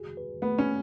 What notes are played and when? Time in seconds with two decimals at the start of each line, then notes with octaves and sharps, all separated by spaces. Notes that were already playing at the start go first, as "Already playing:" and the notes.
Already playing: F#4 G#4
0.17 B4
0.42 A3 B3
0.58 C#4